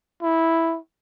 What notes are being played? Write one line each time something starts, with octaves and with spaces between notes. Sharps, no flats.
E4